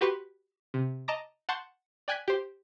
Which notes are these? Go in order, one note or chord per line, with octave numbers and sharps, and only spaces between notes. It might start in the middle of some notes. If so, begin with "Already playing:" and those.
F#4 G4 B4 C6 C#6
C3
D#5 A5 A#5 D6 A#6
F#5 A5 C6 C#6 G6
D5 G5 G#5 F#6 G#6 B6
G4 C5